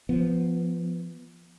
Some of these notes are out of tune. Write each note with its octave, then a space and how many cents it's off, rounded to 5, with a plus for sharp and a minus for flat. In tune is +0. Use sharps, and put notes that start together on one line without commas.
F3 -15 B3 +0